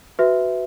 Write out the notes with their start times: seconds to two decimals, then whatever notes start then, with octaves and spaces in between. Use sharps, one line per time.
0.19 F#4 B4 E5